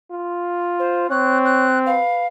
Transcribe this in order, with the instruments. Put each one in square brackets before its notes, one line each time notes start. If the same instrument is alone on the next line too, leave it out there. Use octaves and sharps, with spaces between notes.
[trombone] F4
[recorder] C5
[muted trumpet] C4 [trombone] C#5 [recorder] F#6
[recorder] F#6
[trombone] B4 [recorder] F5